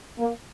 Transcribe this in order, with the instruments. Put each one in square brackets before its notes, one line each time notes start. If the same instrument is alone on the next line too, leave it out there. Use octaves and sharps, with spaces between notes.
[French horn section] A#3